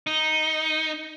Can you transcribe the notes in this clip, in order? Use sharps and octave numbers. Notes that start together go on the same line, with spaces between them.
D#4